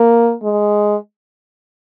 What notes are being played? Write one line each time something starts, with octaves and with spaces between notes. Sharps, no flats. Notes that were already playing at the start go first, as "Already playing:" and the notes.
Already playing: A#3
G#3